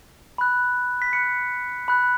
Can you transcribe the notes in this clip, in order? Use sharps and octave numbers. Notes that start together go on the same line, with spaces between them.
B5 F#6
B6
B5 F#6 C#7
B5 F#6